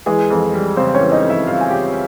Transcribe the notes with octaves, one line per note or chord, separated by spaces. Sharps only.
E3 G#3 G#4
F2
G3
C#3 C4 C5
C#4 C#5
E3
D#4 D#5
F2
E4 E5
G3 F4 F5
G#5
C#3 G4 G5